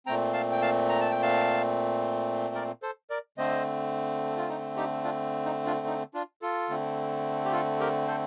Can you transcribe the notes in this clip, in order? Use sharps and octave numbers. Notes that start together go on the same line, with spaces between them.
A#2 A3 C4 G5 A#5
F5 A5
G5
F5 A5
A#5
A5
G5
F5 A5
A#4 D5
A4 C5
A#4 D5
D3 A3 C4 C5 D#5
F4
D#4
D#4 G4
D4 F4
D#4
D4 F4
D#4
D4 F4
F4 A4
D3 A3 C4
G4
F4 A4
G4 A#4
A4 C5